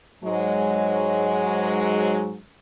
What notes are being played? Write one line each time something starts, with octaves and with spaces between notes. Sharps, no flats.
G#2 F#3 G#3